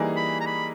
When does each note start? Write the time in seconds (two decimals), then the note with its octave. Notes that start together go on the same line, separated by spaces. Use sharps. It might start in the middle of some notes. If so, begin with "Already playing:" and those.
Already playing: E3 G3 A#3 D#4 G#4
0.17 B5
0.41 A#5
0.46 B5